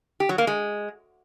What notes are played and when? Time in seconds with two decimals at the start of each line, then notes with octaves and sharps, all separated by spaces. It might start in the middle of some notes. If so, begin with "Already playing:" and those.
0.20 G4
0.29 F#3
0.38 A#3
0.47 G#3